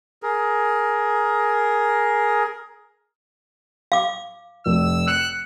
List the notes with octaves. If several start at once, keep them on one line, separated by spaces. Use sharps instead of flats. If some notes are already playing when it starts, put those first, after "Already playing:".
G#4 A#4
F5 D6
F1 E6
F#6 C#7 E7